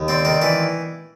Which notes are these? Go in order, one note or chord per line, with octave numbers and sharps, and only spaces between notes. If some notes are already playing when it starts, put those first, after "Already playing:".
Already playing: D#2
C4 D5
D#3 D5
E3 D5